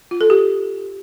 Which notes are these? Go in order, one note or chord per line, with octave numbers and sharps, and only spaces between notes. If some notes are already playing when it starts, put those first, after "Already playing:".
F4
A4
G4